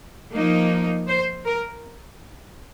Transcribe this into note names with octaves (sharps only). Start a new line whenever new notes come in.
F3 A#3 D#4
C5
A#4